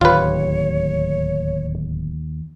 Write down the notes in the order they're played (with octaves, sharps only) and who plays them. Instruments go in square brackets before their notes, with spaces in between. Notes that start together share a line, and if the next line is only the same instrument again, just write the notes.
[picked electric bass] D1 [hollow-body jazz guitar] D#2 [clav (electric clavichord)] F4 B4 [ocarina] C#5